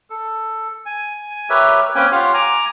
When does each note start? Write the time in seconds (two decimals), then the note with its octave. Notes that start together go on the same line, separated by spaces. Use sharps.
0.10 A4
0.86 G#5
1.50 G4 A#4 B4 C#5 E5
1.95 A#3 C4 C#4 B4 G5 G#5
2.12 F4 G4 C#5 F5 F#5
2.34 G#5 A#5 D6